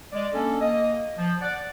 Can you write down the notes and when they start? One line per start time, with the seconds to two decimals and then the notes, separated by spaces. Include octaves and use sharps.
0.12 G#3 D5
0.34 A#3 C#4 D4 A4
0.61 A#3 D#5
1.18 F3
1.41 D5 F#5